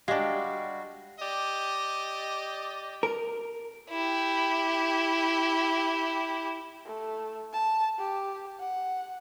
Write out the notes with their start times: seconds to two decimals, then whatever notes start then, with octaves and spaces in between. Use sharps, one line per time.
0.08 G3 G#3 D4 F#4 G4 D5 F5
1.20 G4 D5 D#5
3.03 A#4
3.92 E4 G4
6.86 A3
7.53 A5
7.99 G4
8.60 F#5